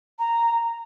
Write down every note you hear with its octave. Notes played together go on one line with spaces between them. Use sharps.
A#5